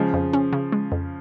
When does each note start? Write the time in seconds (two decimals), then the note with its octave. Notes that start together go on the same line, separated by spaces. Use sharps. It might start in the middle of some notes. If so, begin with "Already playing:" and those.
Already playing: C#3 F3 G#3
0.14 F2
0.33 C#4
0.53 C#3
0.72 G#3
0.92 F2